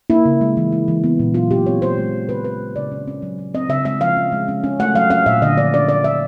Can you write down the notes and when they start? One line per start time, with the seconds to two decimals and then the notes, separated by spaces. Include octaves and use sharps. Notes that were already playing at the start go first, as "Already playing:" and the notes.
0.10 A#3 E4
0.25 C#3
0.41 G#3
0.57 E3
0.72 G#3
0.88 E3
1.04 B3
1.19 A#2
1.34 F#3 F4
1.51 F#3 G4
1.66 C4 C#5
1.82 G#3 C5
1.98 G#3
2.13 E3
2.29 C#3 B4
2.44 F#3 B4
2.60 C#3
2.76 C#3 D5
2.92 C#4
3.08 C#4
3.22 F#3
3.39 F#3
3.54 C4 D#5
3.69 C#3 E5
3.85 G#3 E5
4.01 F3 F5
4.17 C#4
4.32 G#3
4.48 C#4
4.64 C#4
4.79 A3 F#5
4.95 F#3 F5
5.10 C#4 F5
5.26 A#2 E5
5.42 D3 D#5
5.57 F3 D5
5.73 C#4 D5
5.89 C#4 D5
6.04 C#4 E5